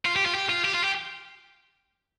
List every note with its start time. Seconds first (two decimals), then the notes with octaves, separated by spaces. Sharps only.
0.05 F4
0.16 G4
0.26 F4
0.35 G4
0.50 F4
0.65 G4
0.74 F4
0.84 G4